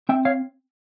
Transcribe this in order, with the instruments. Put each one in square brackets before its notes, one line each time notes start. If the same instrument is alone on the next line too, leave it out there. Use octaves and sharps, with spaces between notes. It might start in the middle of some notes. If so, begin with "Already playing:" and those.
[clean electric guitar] C4 E5 G5
C#5 F5